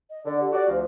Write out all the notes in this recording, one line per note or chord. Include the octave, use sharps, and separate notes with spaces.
D#5
D3 D5
G4
F#4 D5
D2 F3